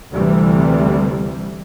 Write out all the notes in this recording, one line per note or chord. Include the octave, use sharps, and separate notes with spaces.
D2 C3 E3 G3